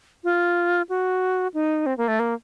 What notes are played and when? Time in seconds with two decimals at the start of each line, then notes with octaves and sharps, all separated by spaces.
0.24 F4
0.89 F#4
1.54 D#4
1.86 C4
1.97 A#3
2.08 A3
2.19 A#3